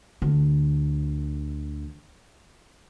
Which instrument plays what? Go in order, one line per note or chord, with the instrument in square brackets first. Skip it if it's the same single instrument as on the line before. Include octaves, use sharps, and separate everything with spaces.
[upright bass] D2 D3